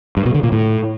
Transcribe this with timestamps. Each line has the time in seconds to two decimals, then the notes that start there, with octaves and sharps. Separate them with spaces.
0.17 G2
0.26 B2
0.34 D3
0.43 A#2
0.52 A2